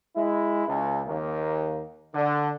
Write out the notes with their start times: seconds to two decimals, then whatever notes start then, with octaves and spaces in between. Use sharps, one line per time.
0.16 G#3 E4
0.68 C#2
1.06 D#2 A#3
2.15 D3